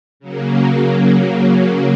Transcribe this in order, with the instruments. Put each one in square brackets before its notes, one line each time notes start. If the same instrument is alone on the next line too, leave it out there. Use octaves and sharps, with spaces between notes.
[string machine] C#3 F#3 A#3